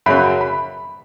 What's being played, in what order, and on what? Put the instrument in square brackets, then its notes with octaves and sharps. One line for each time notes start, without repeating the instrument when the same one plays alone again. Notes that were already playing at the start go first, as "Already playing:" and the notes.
[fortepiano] F#2 C#3 F#3 [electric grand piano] B5
[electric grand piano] B5